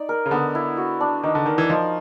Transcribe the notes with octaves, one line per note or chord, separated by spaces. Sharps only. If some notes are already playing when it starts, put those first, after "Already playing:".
Already playing: D#4 D5
A#4
C#3
D3 B3
E4
F#4
D4
D#3 D#4
D3
D#3 A#4
E3
F3 D#4